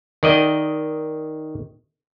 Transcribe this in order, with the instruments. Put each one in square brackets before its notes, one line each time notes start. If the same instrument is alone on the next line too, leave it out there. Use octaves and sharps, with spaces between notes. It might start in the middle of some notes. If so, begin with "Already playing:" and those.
[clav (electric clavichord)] D#3 D5 D#5